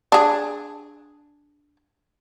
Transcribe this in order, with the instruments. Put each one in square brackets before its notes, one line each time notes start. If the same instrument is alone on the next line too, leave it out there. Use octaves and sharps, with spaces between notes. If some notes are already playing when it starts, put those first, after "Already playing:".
[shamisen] D4 G#4